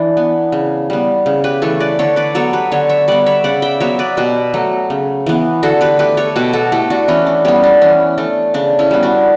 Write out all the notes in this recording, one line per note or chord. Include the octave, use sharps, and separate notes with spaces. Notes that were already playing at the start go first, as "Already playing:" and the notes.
Already playing: E3 D4
B3
C#3
G3 B3
C#3
G4 B4
E3 A3 A4 C#5
B4 D5
D3 A4 C#5
B4 D5
F#3 B3 A4 C#5
G4 B4
D3 A4 C#5
C#5 E5
G3 B3 D5 F#5
C#5 E5
C#3 D5 F#5
E5 G5
F#3 B3 C#5 E5
B4 D5
B2 G4 B4
F#3 A3
C#3
E3 B3
D3 F#4 A4
G4 B4
A3 G4 B4
A4 C#5
B2 G4 B4
F#4 A4
A3 E4 G4
D4 F#4
E3 C#4 E4
D4
G3 B3 C#4
D4
E3 C#4
A3 D4
C#3 D4
C#4 E4
G3 B3
D4 F#4